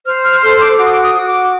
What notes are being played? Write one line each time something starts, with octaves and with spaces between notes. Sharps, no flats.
C5 F6
F6
A4 C6
D6
F#4 D6
D#6
D6
D#6
F#4
D6